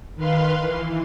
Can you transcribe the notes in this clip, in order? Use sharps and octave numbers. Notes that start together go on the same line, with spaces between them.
D#3 B4 F5 C6
E3